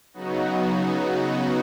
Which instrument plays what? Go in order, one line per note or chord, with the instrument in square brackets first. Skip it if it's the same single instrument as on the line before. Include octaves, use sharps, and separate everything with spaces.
[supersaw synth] C#3 F#3 B3 D#4 F#4